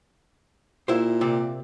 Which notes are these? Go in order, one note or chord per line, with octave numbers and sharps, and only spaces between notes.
A#2 E4 G4 C5
C3 C4 D5